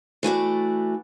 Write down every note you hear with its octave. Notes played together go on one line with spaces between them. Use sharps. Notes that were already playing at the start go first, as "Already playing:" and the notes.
E3 A3 F#4 D5